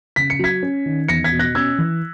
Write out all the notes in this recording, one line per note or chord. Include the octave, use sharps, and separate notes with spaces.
C#3 B6
C#7
F#3 G#6 B6
C#4
D#3
E2 A#6 C#7
G#6 B6
B2
F#6 A#6
C#4 E6 G#6
E3